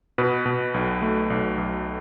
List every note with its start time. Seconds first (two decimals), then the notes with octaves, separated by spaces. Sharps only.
0.18 B2 B4
0.46 B2
0.74 B1
1.02 A3
1.30 B1
1.58 B1